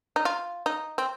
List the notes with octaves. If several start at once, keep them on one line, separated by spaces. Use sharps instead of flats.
D#4
F4
D#4
C4